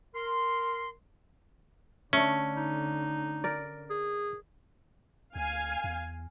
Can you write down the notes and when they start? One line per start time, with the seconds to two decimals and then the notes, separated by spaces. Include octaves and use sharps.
0.15 A#4 C6
2.13 D3 A3 C#4 D4
2.57 D#4
3.44 A#4 D5
3.90 G#4
5.35 D2 F5 G#5
5.84 E2